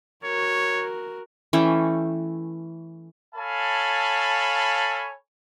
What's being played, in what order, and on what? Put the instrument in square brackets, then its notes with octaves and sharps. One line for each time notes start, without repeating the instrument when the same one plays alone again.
[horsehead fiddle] F#4 A#4 [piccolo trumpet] C#5
[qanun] E3 A3 C#4 G5
[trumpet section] A4 C#5 F5 G#5 A5 B5